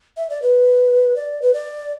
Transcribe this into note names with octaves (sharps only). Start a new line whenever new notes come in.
E5
D5
B4
D5
B4
D5